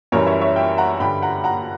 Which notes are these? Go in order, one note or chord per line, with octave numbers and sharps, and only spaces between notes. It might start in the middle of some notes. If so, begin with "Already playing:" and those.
F#2 E3 G3 A#4 C#5
C#5 E5
C#5 E5
E5 G5
F#5 A#5
G2 D3 G3 G5 B5
F#5 A#5
F#5 A#5